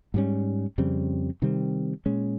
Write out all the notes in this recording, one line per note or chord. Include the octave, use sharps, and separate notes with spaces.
G#2 G3 C#4
F2 C#3 G3 C4
C3 D#3 G3 C4
A#2 G#3 C#4